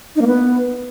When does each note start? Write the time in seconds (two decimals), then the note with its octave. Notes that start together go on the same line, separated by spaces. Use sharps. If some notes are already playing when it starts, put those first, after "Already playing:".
0.16 D#4
0.21 A#3
0.27 B3